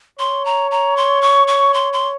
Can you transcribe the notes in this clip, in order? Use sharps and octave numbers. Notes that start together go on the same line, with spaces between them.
C#5 C6
A#5
A#5
C6
C#6
C#6
C6
C6